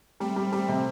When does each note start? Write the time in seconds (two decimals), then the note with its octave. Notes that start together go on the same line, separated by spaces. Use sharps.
0.20 G3 A3 C4
0.36 G3
0.52 G3 A3 C4
0.68 C3